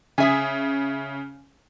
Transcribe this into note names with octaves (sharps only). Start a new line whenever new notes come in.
C#3 G#4 E5 G#5